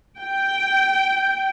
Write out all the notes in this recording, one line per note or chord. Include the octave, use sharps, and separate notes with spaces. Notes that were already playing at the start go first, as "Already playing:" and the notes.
G5